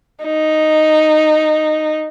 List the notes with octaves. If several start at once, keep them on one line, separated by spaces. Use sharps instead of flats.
D#4